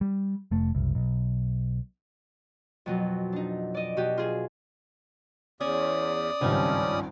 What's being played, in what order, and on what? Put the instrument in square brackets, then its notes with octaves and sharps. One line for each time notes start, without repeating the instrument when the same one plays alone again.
[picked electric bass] G3
F1 A3
F#1 C2
B1
[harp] F2 B2 F#3
D4 D#4
D5 D#5
B2 F#4 G4
F4 G#4
[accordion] E2 [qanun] C#4 [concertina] D5 D#6
[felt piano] G#1 C#2 G2 [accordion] F3 C#4 [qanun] C4 D#4